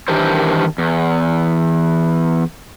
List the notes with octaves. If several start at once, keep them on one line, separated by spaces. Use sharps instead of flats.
D#3 E3 D4 G4 A#4 C5
E2